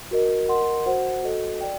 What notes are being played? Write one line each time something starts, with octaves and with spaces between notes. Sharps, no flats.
F#4 A#4 D#5
A#4 D#5 F#5 C6
F#4 C5 F#5
F#4 A4 D#5
D5 G5